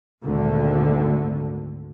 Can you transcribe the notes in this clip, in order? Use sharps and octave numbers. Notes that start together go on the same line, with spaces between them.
G#1 D2 A#2 D3